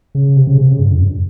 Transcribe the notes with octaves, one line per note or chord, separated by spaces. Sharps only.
C#3
C3
C#3
C3
C#3
G2
F2
G2